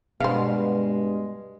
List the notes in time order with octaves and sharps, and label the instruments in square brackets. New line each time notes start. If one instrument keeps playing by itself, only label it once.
[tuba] G2 [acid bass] B2 [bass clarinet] G#3 [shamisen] C5 F5